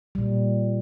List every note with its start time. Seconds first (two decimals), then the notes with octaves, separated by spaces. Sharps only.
0.15 A#2 G3